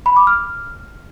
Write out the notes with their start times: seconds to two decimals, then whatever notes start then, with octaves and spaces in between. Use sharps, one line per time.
0.06 B5
0.16 D6
0.27 F6